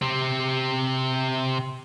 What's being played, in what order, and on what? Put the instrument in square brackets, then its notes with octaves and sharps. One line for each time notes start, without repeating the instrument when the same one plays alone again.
[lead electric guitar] C3 C4